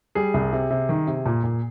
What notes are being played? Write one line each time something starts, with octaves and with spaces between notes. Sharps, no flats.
G3 G#4
C2
C3
C3
D#3
C3
A#2
A#2